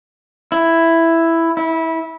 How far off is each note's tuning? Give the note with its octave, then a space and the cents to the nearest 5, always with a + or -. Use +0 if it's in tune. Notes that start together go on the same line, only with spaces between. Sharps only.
E4 +5
E4 -20